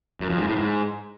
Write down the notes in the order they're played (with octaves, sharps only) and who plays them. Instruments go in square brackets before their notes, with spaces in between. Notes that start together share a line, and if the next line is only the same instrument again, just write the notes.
[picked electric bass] F#2
F2
G#2
A2
G#2